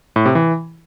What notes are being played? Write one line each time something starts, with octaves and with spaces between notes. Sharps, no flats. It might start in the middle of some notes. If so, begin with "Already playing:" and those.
A2
C3
E3